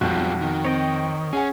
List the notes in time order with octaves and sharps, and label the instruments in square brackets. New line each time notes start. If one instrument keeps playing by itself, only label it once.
[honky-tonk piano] B1 A5 G6 [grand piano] F2 [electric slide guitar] G#2 G3 F4 [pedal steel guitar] F#4
[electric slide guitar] D#3
[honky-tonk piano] C4 [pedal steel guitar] C#5 D#5 G5
[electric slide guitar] C#4 [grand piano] G#4 F#5 G#5